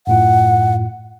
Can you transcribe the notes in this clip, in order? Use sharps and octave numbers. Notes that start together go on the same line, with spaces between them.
F#2 A2 F4 F#5